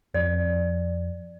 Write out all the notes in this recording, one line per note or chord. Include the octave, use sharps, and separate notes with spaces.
F2 D5